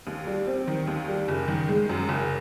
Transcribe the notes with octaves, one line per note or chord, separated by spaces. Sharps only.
D#2
G3
C4
D#3
D#2
G3
F#1
D#3
G#3
F#2
F#1